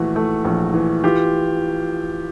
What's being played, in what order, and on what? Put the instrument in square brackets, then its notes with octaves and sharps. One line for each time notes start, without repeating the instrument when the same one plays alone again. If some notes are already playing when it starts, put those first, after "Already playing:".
Already playing: [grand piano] A#1 E3 A3 F#4
A3
A#1
E3
E3 F4 G4